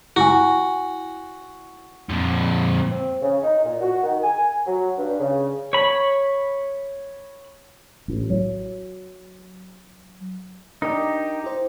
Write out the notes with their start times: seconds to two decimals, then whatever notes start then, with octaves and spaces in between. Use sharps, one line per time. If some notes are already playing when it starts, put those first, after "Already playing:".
0.16 E4 F#4 G#5
2.09 F2 A#2
2.91 C4
3.22 C#3
3.43 D#4
3.64 A#2
3.81 F#4
4.03 D#3
4.23 G#5
4.66 F#3
4.98 G2
5.19 C#3
5.73 C#5 B5
8.08 A1
8.30 F#3
10.82 D4 D#4 G4 A#4
11.44 E4 C5